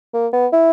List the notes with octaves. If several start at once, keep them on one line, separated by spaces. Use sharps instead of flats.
A#3
B3
E4